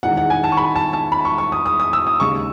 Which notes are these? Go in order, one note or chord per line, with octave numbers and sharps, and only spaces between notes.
E1 E2 D#3 F#5
F#5
G#5
A5
C#6
B5
A5
A5
B5
C#6
C#6
D#6
D#6
D#6
E6
D#6
D#2 C#3 G#3 C#6